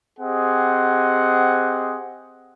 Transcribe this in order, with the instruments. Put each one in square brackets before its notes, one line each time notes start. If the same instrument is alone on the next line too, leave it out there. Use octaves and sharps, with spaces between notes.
[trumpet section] C4 G4 G#4 D#5 F#5